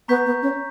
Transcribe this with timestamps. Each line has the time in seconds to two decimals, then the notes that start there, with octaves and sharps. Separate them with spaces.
0.08 B3 A#5 C#6 G6 B6
0.26 B3
0.42 C#4